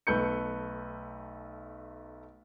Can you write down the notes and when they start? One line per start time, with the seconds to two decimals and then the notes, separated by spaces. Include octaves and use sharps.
0.07 B1 A3 B4 G6 C#7